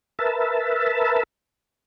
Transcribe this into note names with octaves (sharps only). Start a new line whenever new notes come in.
A#4 B4 E5 A5